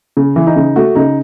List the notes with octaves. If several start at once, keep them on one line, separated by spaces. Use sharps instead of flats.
C#3
E3
D#4
C#3
A3 F#4
C#3 D#4